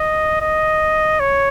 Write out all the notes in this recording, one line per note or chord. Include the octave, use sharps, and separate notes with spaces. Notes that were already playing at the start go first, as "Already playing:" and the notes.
Already playing: D#5
D#5
C#5